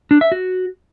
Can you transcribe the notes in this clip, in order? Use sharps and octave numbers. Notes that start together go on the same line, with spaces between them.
D4
E5
F#4